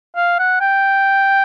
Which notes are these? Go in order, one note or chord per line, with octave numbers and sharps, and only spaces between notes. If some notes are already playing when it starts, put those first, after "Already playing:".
F5
F#5
G5